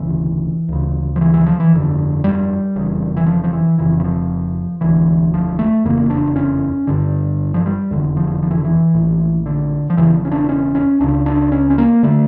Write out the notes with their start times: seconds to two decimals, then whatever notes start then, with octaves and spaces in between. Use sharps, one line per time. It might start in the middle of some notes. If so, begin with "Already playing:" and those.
Already playing: E1 D2 C#3 E3
0.69 D2 C#3
1.16 F3
1.21 E3
1.34 E3
1.46 F3
1.60 E3
1.73 G1 F2 D3
2.24 G3
2.76 F1 E2 C#3
3.17 E3
3.26 F3
3.44 F3
3.53 E3
3.78 F1 F2 C#3 E3
4.00 E3
4.04 F3
4.81 E1 D2 D3 E3
5.34 F3
5.59 A3
5.84 F1 E2 C#3 A#3
6.10 D4
6.36 C#4
6.87 G1 G2 D3
7.54 F3
7.66 G3
7.91 F1 E2 D3
8.17 F3
8.43 F3
8.51 E3
8.58 D3
8.65 E3
8.94 A#1 A2
9.46 D3
9.90 F3
9.97 E1 E2 C#3 E3
10.14 F3
10.25 C#4
10.32 D4
10.49 C#4
10.75 C#4
11.00 C#2 C#3 D4
11.26 D4
11.52 C#4
11.70 C#4
11.78 A#3
12.03 D3 A3